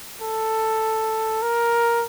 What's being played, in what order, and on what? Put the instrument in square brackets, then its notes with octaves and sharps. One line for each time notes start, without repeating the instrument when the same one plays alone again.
[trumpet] A4
A#4